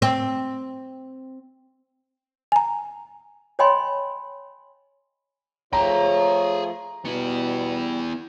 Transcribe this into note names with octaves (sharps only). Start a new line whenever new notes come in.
C4
G#5 A#5
C#5 D#5 G5 G#5 B5 C6
F3 A3 F4 G#4 C#5 G5 A#5
B2 G3 B3 E4